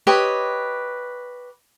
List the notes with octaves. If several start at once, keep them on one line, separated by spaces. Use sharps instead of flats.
G4 B4 C#5 D#5